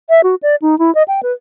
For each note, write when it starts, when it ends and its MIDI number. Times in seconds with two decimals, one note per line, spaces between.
0.09 0.21 76
0.23 0.35 66
0.43 0.55 74
0.62 0.78 63
0.79 0.93 64
0.95 1.03 75
1.08 1.20 79
1.23 1.32 71